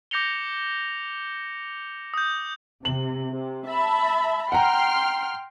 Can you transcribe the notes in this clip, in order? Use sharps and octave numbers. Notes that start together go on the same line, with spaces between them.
D6 G6 A#6 C#7 F7 G7
D#6 G6
C3 F#7
C3
E5 A5 B5
F#5 G5 A#5 C6 F6